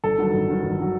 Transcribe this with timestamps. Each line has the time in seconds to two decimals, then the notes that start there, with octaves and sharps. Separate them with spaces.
0.04 G1 A4
0.18 G2 D#3 F#3
0.34 G1
0.49 G2 D#3 F#3
0.63 G1
0.80 D#3 F#3